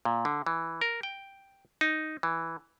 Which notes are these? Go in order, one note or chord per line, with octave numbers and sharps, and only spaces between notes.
A#2
D3
E3
A#4
G5
D#4
E3